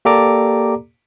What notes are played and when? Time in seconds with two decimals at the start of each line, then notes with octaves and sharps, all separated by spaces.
0.05 A#3 G4 A4 D5 A#5 D6